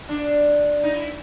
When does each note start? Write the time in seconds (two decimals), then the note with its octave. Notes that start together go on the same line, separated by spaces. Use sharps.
0.09 D4
0.83 D#4
0.96 E4